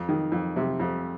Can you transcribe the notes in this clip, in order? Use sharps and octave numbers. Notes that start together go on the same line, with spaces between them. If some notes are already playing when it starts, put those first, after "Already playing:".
Already playing: F2
D#3
F2
C3
F2